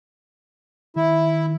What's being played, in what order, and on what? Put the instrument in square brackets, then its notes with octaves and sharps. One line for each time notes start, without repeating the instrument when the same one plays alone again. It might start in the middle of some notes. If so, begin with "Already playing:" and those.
[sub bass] D#3 [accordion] E4